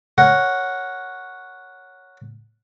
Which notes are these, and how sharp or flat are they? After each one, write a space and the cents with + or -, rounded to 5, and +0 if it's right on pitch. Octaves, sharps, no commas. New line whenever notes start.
A#4 +0 C#5 +0 F#5 +0